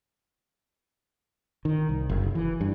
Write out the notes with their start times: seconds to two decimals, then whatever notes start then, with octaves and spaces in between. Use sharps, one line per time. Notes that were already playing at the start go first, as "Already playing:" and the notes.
1.65 D#3
1.89 C2
2.09 F#1
2.35 E3
2.61 G2